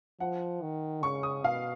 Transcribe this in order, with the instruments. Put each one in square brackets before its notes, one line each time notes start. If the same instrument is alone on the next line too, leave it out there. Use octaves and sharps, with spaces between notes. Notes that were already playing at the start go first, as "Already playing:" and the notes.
[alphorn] F3 [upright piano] F#5
[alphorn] D#3
[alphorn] C#3 [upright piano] C#6
[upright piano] D#6
[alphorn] B2 [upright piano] F5